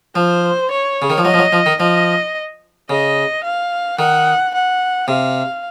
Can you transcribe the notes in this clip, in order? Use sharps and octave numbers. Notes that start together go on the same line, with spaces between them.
F3 C5
C#5
C#3
D#3
F3
F#3 D#5
F3
F#3
F3
D#3
F3 D#5
C#3 D#5
F5
D#3 F#5
F#5
C3 F5